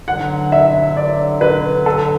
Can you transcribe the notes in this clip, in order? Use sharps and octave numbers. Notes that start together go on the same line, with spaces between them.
G2 D3 F#3 F#5
E5
D5
B4
A4